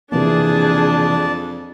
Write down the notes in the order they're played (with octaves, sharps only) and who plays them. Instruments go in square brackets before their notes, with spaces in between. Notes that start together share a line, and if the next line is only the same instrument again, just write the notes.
[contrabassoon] F2 [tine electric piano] C3 E3 A#3 [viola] D4 G#4 [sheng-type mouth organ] D5 A5